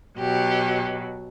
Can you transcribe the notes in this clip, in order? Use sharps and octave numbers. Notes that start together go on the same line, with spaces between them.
B2 F#3 G4